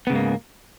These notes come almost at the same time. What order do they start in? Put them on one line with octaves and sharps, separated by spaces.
B3 C#3 G#2 A#3